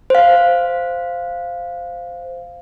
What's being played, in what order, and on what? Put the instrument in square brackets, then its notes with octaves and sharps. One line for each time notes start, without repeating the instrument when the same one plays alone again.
[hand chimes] C5 F5